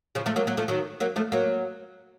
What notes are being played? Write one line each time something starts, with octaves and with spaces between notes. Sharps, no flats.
C#3 F3
F3 A3
F#3 A#3
F#3 A#3
F3 A3
D#3 F#3
F#3 A#3
F3 A3
F#3 A#3